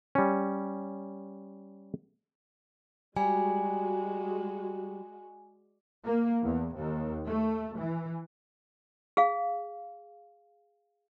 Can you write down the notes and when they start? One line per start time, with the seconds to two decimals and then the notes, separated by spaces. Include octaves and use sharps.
0.15 G3 C#4
3.16 G3 G#3 F#4 G#5
6.05 A#3
6.43 E2
6.77 D#2
7.27 A3
7.77 E3
9.17 G#4 F5